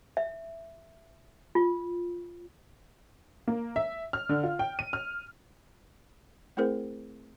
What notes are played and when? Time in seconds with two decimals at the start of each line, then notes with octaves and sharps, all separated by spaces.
0.17 E5
1.55 F4
3.48 A#3
3.76 E5
4.13 F6
4.29 D3
4.44 F4
4.59 G5
4.79 D#7
4.93 F6
6.57 A3 C4 E4 G#4 A#4 C5